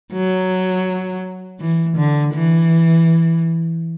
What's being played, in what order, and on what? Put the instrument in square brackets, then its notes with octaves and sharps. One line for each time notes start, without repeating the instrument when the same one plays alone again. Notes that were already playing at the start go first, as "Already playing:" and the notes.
[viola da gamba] F#3
E3
D3
E3